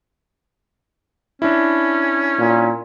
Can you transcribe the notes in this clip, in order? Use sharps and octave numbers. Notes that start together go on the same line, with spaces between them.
C#4 D4 E4
A#2